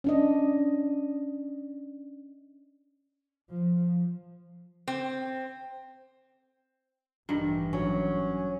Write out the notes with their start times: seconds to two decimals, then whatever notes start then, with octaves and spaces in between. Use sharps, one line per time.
0.04 C#4 D4 D#5
3.50 F3
4.88 C4
7.29 A1 G2 D#3 E3
7.73 F#3 C#4